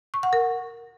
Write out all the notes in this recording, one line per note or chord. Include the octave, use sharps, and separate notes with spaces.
C#6
F#5
A#4